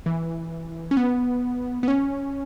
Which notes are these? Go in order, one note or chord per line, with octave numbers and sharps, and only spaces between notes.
E3
C#4
B3
B3
C#4